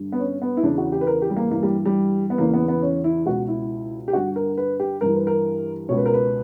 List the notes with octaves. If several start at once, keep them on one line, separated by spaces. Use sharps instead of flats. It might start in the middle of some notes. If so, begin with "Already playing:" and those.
Already playing: G2 D3
B3
C#4
B3
E4
E2 C#3 E3 D4
F#4
G4
B4
A#4
G4
G3
A#3
G2 E3 A#3
G3
G3
B3
E2 C#3 E3 A#3
B3
B3
C#4
E4
C#2 B2 F#4
E4
G4
G2 D3 F#4
A#4
B4
G4
G2 E3 A#4
B4
A#4
C#2 B2 C#5
B4
A#4
B4